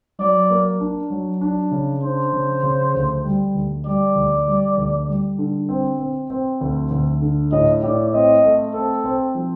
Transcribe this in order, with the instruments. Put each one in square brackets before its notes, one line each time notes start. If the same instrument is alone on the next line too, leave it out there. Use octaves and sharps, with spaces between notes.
[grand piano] F#3 [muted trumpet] D5
[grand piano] A#3
D4
F#3
D4
C#3
[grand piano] D4 [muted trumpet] C5
[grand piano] C#3
C#3
D2
G3
D2
[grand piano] G3 [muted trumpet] D5
[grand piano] D2
G3
D2
G3
D3
C4
C4
C4
D2
D2
D3
[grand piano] A2 [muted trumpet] D#5
[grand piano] A2 [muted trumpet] D5
[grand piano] C4 [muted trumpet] D#5
[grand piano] A3
[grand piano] C4 [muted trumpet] A4
[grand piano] C4
F3